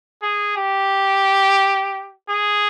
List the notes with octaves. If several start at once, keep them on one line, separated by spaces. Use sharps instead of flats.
G#4
G4
G#4